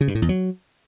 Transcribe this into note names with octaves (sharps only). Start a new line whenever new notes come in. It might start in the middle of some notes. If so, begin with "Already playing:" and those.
C#3
G2
A2
E2
F#3